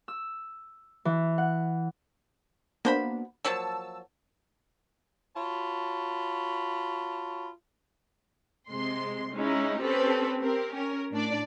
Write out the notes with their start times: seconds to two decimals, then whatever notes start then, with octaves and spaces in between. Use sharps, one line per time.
0.08 E6
1.05 E3
1.38 F#5
2.85 A#3 B3 D4 F#4 C5 B5
3.45 F3 F#3 A#3 A5 E6
5.36 F4 F#4 C#5 A5 B5
8.69 C3 G#3 C6
9.33 G#3 C#4 D#4 E4
9.81 C4 C#4 G4 A4 B4
10.42 C4 G4 A#4
10.75 C#4 A#4
11.11 A2 D4 D5